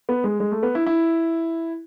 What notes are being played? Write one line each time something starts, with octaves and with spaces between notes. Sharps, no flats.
B3
G#3
G#3
A3
B3
E4
E4